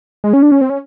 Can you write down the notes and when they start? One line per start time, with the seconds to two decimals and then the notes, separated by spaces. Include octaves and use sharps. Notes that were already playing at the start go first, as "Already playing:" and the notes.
0.24 G#3
0.33 C#4
0.42 D4
0.52 C#4
0.61 C4
0.70 C#4